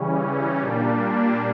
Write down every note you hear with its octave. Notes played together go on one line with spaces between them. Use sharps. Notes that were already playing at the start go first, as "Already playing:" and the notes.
Already playing: C#3 E3 G3 C#4
A#2 G3 A#3 D4